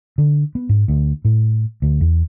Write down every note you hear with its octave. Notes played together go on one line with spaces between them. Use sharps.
D3
B3
G#2
D2
A2
D2
E2